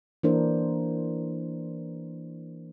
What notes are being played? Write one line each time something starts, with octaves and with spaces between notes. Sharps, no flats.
E3 A#3 D4 A#4 C5